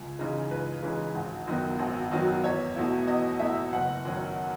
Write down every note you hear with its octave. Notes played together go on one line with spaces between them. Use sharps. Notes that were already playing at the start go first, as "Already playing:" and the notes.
Already playing: C#2
C#3 E3 G#3 D#4
C#2 B4
C#3 E3 G#3 D#4
G#1
F#2 D#3 F#3 B3
G#1
F#2 D#3 F#3 B3
E2 C#5
B2 A3 E4
E2 D#5
B2 A3 E4 E5
F#1 F#5
F#2 D#3 F#3 C#4